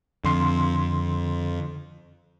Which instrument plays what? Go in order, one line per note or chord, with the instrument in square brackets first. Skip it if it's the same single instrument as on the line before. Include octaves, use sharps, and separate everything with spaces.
[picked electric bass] F2 [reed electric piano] D3 C6